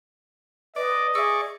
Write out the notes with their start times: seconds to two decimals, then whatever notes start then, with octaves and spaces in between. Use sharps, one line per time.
0.76 B4 D5 D#5
1.15 G#4 D5 E5 C#6 E6